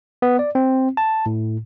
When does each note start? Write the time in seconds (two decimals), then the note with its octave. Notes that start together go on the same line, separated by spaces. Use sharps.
0.22 B3
0.39 D5
0.55 C4
0.97 A5
1.26 A2